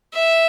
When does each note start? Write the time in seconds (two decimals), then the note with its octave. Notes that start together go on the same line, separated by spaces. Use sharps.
0.14 E5